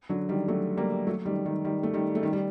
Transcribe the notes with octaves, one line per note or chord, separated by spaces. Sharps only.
D3 F#3
D#3 G3
F#3 A3
G3 A#3
F#3 A3
D#3 G3
D#3 G3
D#3 G3
A3
D#3 G3
A3
D#3 G3
G3